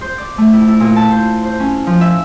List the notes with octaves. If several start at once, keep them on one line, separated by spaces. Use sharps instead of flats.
C5
D5
A3
E4
E4
A#2
A5
C5
C5
C#4
F3
E5